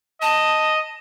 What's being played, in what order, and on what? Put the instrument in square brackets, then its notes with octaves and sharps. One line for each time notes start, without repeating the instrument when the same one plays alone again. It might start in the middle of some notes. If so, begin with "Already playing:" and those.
[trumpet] D#5 [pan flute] A5